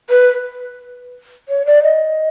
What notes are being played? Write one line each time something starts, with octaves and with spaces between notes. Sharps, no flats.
B4
C#5
D5
D#5